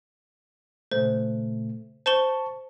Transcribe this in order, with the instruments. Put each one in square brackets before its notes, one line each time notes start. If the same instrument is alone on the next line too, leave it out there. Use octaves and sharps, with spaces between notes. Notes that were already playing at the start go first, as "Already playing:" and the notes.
[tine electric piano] A#2 C#3 A3 [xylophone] C5
[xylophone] C5 E7 G7 [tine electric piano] A5 C#6